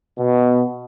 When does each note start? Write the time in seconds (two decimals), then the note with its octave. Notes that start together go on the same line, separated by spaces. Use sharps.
0.18 B2